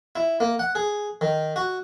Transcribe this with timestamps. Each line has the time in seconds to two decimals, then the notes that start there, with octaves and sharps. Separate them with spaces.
0.15 E4
0.40 A#3
0.59 F#5
0.75 G#4
1.21 D#3
1.56 F#4